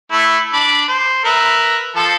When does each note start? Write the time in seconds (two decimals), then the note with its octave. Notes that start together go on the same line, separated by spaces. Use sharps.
0.12 A3 E4
0.53 D4 B5 D6
0.88 C5
1.24 A#4 B4 E5
1.96 F3 A4 A5